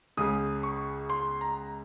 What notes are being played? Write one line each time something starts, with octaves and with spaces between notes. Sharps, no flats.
C#2 C#3 G#3 D#6
C#6
C6
A#5